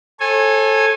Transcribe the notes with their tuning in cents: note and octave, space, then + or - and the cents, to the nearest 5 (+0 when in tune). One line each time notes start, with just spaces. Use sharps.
A4 -5 C#5 -40 G#5 -5